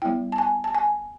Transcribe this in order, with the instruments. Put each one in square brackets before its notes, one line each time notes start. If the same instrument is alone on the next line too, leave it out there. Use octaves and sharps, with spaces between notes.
[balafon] G3 B3 E4 G5
A5
G#5
A5
G#5